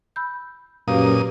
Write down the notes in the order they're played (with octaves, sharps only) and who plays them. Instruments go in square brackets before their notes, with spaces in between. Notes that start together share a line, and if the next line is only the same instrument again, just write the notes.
[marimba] B5 E6 G6
[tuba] F#2 [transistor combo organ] A#2 D#6 [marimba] G4 B4 F5